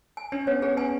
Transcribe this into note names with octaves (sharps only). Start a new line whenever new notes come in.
G#5
C#4 D4
B3 C#5
B3 G#4
C#4 G#5